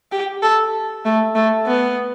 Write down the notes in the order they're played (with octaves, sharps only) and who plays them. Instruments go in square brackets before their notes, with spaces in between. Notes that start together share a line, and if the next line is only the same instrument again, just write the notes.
[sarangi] G4
A4
A3
A3
B3